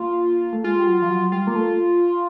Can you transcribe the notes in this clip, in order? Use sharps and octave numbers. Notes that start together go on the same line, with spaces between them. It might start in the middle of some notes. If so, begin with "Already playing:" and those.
Already playing: A#3 F4
A3
G#3 F4
G3
F#3
F3
F#3
G3 F4
A#3
A3